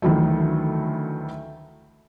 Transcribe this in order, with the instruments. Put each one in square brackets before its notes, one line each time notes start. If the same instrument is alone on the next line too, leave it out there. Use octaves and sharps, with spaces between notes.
[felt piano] D2 D#3 E3 F#3 A3